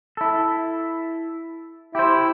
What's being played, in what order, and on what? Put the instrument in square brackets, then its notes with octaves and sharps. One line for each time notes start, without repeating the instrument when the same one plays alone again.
[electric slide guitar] E4 A4
[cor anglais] E4 [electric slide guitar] G4 C5